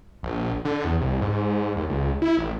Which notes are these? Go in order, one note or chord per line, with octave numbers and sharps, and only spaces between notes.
A#1
D3
E2
C2
G#2
D#2
C#2
E4
A1